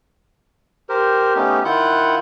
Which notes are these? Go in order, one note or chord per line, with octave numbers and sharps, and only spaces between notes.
G4 A#4 C5
A3 B3 C#4 D#4 G4
D#3 E4 F4 F#5 F#6 G6